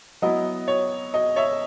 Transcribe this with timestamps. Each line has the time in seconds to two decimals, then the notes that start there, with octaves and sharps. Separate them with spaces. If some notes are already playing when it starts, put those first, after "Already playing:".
0.22 F#3 B3 E4 D#5
0.68 C#5
1.14 D#5
1.36 C#5 E5